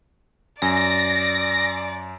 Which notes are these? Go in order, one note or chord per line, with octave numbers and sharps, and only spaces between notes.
F#2 D5 G#5 A#6